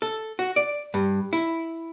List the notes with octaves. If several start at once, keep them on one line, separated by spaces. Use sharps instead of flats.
A4
F#4
D5
G2
E4